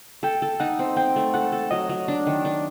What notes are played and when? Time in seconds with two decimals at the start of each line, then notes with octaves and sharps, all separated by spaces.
0.23 A4 G5
0.42 A4
0.60 D#4 F#5
0.79 C4
0.97 C4 G5
1.16 A3
1.34 A4 F#5
1.52 A4
1.71 F#3 D#5
1.89 F#3
2.08 D4
2.27 D#3
2.45 D4